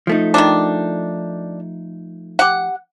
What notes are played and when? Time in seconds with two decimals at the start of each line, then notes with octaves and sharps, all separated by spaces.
0.07 F3 A3 D#4
0.34 D#3 G3 D4
2.39 G4 F#5